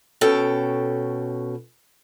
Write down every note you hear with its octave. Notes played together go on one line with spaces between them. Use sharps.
B2 C#4 A4 G5